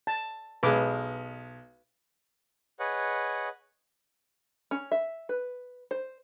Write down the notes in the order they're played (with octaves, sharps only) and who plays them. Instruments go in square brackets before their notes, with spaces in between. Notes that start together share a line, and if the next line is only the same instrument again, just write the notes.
[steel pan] A5
[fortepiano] B1 G#3 [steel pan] B4 D6
[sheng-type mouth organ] G#4 B4 C#5 D#5 F#5
[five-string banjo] C#4
E5
B4
C5